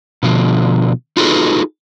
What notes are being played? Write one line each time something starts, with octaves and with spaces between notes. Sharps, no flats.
B2 D3 F3
D#4 F4 F#4 G#4 A4 B4